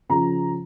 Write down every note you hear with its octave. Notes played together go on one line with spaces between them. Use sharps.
C#3 F3 A#5